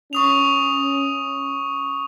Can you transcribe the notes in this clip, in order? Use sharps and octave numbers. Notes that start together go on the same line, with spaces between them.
C#4 C#6 D#6 F7